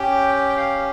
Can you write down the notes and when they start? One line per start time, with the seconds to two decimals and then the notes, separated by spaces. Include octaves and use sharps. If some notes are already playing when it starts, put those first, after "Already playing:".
Already playing: C#4 G4 G5
0.49 G5
0.57 F5